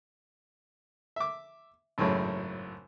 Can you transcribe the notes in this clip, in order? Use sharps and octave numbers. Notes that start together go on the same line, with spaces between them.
E5 D6
G#1 F#2 A2 C#3 C#5